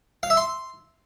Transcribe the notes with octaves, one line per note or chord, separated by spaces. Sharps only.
F5
E5
C6